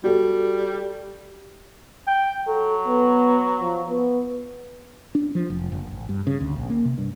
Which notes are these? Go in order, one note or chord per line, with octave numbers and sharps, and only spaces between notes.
G3 F#4 A4
G5
F#3 A4
B3
F3
B3
D4
F3
F1
F#1
A1
G2
C#3
D2
A#1
A#3
C3
G2